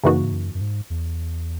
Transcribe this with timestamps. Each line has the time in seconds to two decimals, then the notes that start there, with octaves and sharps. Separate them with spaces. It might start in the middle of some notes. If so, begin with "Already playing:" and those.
0.04 F#2 C#3 E3 A#3 D#4 F#4
0.23 G#2
0.32 F#2
0.54 F#2
0.61 G#2
0.90 E2